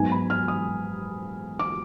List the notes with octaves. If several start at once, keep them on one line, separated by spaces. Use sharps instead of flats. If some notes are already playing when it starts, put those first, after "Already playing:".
Already playing: G#2 F#3 B3 D#4 G#5
B5
F6
D#6
D6